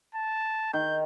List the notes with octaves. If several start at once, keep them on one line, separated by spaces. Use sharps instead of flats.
A5
D#3 G6